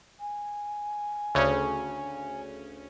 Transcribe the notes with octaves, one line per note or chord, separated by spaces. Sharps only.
G#5
D2 C#3 C#4